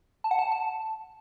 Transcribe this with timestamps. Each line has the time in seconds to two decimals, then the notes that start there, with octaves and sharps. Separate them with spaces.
0.24 A5
0.31 F#5
0.39 A5
0.52 A5